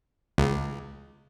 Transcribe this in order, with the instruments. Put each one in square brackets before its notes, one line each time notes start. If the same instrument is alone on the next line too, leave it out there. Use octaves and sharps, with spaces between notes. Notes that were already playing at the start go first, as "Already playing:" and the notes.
[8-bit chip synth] C#2